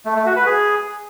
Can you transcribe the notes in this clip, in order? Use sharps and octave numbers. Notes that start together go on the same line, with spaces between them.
A3
A3
F#4
B4
G#4